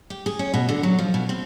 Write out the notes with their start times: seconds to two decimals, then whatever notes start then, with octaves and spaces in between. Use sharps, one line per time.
0.10 G4
0.26 G#4
0.39 C#4
0.54 B2
0.69 D3
0.83 F#3
0.99 F3
1.14 B2
1.29 C4